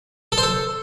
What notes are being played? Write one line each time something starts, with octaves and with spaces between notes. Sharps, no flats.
A4
C5
A4